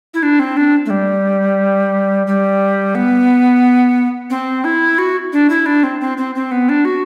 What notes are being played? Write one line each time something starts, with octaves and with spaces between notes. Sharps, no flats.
E4
D4
C4
D4
A3
G3
G3
B3
C4
E4
F#4
D4
E4
D4
C4
C4
C4
C4
B3
D4
F#4